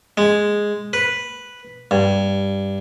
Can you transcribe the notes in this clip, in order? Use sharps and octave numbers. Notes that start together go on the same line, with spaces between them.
G#3
B4
G2